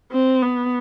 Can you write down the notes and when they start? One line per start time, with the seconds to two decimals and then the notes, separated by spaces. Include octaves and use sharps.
0.11 C4
0.42 B3